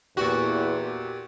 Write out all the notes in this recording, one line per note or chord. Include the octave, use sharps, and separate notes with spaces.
E2 A#2 F#4 G4